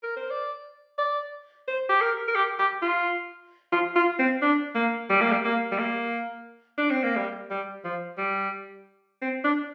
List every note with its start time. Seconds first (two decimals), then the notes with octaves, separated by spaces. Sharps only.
0.03 A#4
0.17 C5
0.30 D5
0.98 D5
1.68 C5
1.89 G4
2.01 A#4
2.28 A#4
2.35 G4
2.59 G4
2.82 F4
3.72 F4
3.96 F4
4.19 C4
4.42 D4
4.75 A#3
5.10 G3
5.21 A#3
5.32 G3
5.45 A#3
5.72 G3
5.79 A#3
6.78 D4
6.91 C4
7.04 A#3
7.16 G3
7.50 G3
7.84 F3
8.18 G3
9.22 C4
9.44 D4